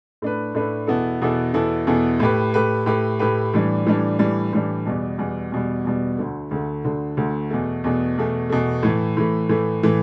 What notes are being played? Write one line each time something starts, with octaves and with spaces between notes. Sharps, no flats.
A2 A3 D4 B4
A2 A3 D4 B4
E2 B2 B3 E4 A4
E2 B2 B3 E4 A4
E2 B2 B3 E4 A4
E2 B2 B3 E4 A4
A2 A3 G4 B4
A2 A3 G4 B4
A2 A3 G4 B4
A2 A3 G4 B4
A2 E3 G3 D4
A2 E3 G3 D4
A2 E3 G3 D4
A2 E3 G3 D4
E2 B2 G3
E2 B2 G3
E2 B2 G3
E2 B2 G3
D2 D3 A3
D2 D3 A3
D2 D3 A3
D2 D3 A3
E2 B2 A3
E2 B2 A3
E2 B2 A3
E2 B2 A3
A2 E3 A3
A2 E3 A3
A2 E3 A3
A2 E3 A3